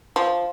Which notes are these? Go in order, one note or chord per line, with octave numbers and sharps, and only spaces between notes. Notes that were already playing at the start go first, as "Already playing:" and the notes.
F3